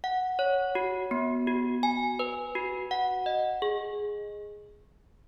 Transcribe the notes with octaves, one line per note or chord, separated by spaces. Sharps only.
F#5
C#5
F#4
B3
F#4
G#5
B4
F#4
F#5
D#5
G#4